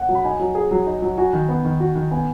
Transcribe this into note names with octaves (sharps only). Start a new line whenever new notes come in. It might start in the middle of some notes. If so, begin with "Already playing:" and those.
Already playing: F#5
F#3
B5
D#4 G#5
F#3
G#4
F#3
D#4
F#3
F#4 G#5
D#3
B3
D#3
F#4
D#3
B3 G#5